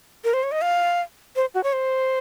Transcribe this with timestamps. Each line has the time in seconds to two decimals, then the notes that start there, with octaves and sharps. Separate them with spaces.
0.24 A#4
0.33 C5
0.43 C#5
0.52 D#5
0.62 F5
1.36 C5
1.54 F#4
1.64 C#5
1.73 C5